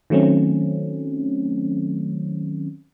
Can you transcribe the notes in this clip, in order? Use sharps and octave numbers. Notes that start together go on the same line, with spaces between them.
D#3 F#3 A3 C4 C#4